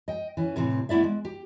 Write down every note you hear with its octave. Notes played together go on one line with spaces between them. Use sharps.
D#5 G5
E3 C#4
A2 C3 E3 C4
A3 B3 E4 D5 E5
G#3
G4